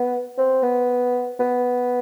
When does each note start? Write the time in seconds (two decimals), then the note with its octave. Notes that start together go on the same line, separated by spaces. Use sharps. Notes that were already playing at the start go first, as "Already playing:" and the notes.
Already playing: B3
0.38 C4
0.63 B3
1.40 B3